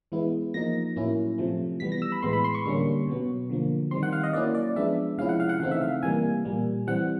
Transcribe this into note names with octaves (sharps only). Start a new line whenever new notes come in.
E3 G#3 B3 E4
F3 A#3 D#4 A#6
A2 F#3 A#3 C#4 E4
C3 F3 A3
E3 G3 B3 B6
A#6
E6
B5
A2 E3 G#3 B3 C6
B5
C6
C#6
D3 G3 A#3 C#4 C#6
B2 F#3 B3
D3 F3 A#3
D#3 G3 C4 C6
F#5
F5
D#5
F#3 A#3 C#4 E4 D5
D5
F3 G#3 B3 D4 E5
C3 F3 G#3 C#4 E4 F5
F#5
F5
F#5
C#3 E3 A3 C4 D#4 F5
E5
F5
C3 E3 G3 A#3 G#5
A#2 G3 A#3
E3 G3 C4 F#5